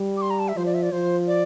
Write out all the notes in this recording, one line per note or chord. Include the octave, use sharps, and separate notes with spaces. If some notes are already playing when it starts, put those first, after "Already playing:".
Already playing: G3
D6
C6
A#5
A5
E5
F3 C5
D5
E5
D5
F3 C5
D5